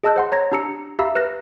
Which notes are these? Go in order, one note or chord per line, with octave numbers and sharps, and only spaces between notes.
G#4 D#5 A5 E6 F#6 G6
C5 F#5 C6
C#5 A#5 G#6 A#6
D4 G4 A#5 E6 C#7
G4 E5 F5 A#5 B5 E6
B4 F6 F#6 A#6